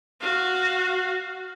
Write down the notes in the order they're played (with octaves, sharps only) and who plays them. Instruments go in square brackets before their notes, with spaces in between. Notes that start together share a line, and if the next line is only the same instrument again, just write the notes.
[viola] F#4 F5